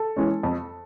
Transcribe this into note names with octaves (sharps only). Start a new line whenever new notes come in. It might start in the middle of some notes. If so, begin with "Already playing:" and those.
Already playing: A4
E3 G#3 C#4
F2